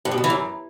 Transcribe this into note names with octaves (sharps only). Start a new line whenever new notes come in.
G2
B2
F2
E3
F#2